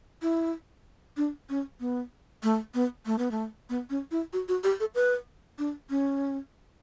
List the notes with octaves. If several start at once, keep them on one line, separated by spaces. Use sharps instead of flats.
E4
D4
C#4
B3
A3
B3
A3
B3
A3
B3
C#4
E4
F#4
F#4
G4
A4
B4
D4
C#4